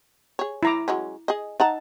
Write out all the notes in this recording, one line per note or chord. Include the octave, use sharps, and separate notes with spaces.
G#4 C#5
E4 A#5 D6
F#3 G#3 C#4
G#4 D#5
D#4 F#5 A5 A#5